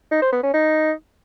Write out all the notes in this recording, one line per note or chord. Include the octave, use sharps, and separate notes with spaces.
D#4
C5
B3
C#4
D#4